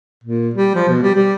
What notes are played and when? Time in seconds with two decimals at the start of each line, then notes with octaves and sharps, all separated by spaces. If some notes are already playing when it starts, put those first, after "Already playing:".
0.24 A#2
0.54 G3
0.75 F3
0.89 B2
1.02 G3
1.15 G3